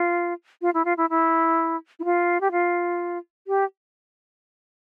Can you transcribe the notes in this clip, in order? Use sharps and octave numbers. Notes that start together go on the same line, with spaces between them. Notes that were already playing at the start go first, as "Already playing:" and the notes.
Already playing: F4
F4
E4
F4
E4
E4
E4
F4
G4
F4
G4